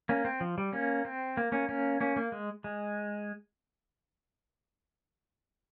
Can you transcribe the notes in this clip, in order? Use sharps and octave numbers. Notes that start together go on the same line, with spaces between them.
A#3 C#4
C4
F3
G3
A#3 C#4
C4
A#3
A#3 C#4
A#3 C#4
A#3 C#4
A#3
G#3
G#3